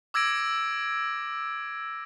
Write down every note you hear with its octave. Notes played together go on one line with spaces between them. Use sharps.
D6 E6 G#6 A#6 D7